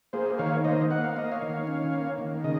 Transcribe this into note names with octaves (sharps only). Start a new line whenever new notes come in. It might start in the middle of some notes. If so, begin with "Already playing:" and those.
A#3 G#4 C5
D#3 C#5 F5
A#3 C5 D#5
A#3 F#5
F5
A#3 D#5
C#5 F5
D#3
C#4
A#3
D#3
C#3 D#5